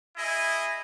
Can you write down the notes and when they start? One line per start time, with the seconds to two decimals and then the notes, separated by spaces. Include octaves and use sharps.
0.17 E4 G#4 D#5